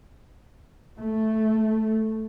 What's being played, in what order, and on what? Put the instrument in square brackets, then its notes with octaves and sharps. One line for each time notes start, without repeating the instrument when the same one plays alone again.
[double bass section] A3